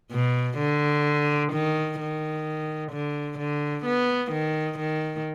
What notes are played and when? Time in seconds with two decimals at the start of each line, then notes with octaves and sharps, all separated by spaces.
0.12 B2
0.59 D3
1.53 D#3
2.00 D#3
2.92 D3
3.39 D3
3.85 B3
4.32 D#3
4.79 D#3